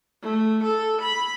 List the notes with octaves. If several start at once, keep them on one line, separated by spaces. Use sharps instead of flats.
A3
A4
B5